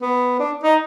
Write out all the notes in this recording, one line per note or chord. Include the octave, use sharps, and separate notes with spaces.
B3
D4
D#4